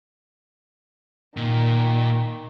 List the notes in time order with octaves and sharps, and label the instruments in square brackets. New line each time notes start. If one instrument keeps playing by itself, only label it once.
[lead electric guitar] A#2 [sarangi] D#3